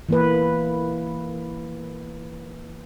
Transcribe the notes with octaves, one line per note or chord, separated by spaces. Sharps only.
E3 A#3 B4